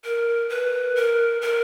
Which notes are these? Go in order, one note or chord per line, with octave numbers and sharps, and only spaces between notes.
A#4
B4
A#4
A#4